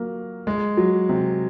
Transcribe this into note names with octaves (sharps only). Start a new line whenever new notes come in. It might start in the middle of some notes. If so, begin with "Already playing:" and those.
Already playing: F#3 A#3
G#3
F#3
C3